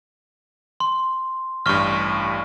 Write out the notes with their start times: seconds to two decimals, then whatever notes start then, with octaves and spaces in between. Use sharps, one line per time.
0.80 C6
1.66 A1 G2 C#6 F6